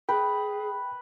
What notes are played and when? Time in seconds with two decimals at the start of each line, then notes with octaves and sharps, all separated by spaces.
0.09 G#4 B4 G5